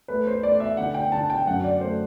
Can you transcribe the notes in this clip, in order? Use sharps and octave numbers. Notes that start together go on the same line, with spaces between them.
A3 B4
C5
A3 D5
E5
D3 F#5
G5
D3 A5
G5
F#2 F#5
D5
A3 C5